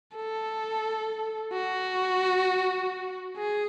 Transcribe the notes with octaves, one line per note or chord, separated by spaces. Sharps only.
A4
F#4
G#4